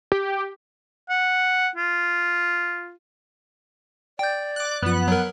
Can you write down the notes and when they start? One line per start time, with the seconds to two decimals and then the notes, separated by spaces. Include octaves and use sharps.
0.12 G4
1.09 F#5
1.76 F4
4.19 D5 G5 G6
4.56 D6 F#6
4.82 F#2 F3 B3 F#6
5.08 F#3 A#4